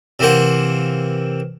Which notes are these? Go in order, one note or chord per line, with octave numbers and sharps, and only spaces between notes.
C3 E3 A#3 C5 F#5